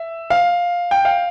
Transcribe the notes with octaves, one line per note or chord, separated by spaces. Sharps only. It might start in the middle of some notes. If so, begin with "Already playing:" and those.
Already playing: E5
F5
G5
F5